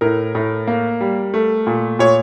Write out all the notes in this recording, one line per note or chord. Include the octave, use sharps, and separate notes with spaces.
A2 A#4
A2
A#3
G3
A3
A#2
A#2 C#5